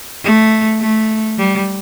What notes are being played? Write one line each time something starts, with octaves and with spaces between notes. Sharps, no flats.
A3
A3
G3